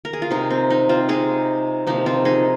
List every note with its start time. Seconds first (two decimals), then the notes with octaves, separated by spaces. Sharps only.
0.05 A#4
0.13 G#4
0.22 F4
0.31 C3 G#3 D#4
0.50 C4
0.70 D#4
0.89 C4 F4
1.08 C3 G#3 D#4 G#4
1.87 C3 F3 A#3 D#4
2.06 C4 F4
2.25 D#4 G#4